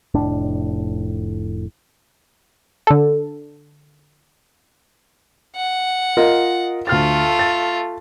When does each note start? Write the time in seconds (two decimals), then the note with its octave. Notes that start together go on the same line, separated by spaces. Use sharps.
0.14 F1 A2 D4
2.87 D3 A4
5.56 F#5
6.17 F4 A#4 D#5
6.87 D2 A3 F4 F6 A6
7.39 A6